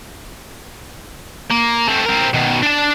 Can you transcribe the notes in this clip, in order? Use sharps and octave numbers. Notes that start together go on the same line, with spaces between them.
A#3
A3 C4
C4 A#4
B2 D#3
D4 A5